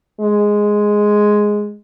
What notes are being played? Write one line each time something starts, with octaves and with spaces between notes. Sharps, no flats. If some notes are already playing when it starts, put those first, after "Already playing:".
G#3